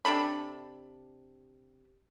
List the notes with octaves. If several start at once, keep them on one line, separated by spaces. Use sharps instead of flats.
C3 D4 A4 B5